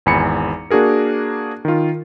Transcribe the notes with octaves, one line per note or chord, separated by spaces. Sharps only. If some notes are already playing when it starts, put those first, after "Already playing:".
G#1 E2 G#5 B5 C#7
A#3 D4 F#4 G#4 A#4
D#3 F4